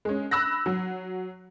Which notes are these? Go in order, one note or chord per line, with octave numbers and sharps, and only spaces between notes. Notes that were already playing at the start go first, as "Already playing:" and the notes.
G#3 C#4
B5 E6 F#6 A#6
F#3